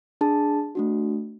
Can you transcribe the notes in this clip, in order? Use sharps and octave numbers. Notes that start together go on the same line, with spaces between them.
D4 G#4 A5
A3 D4 F#4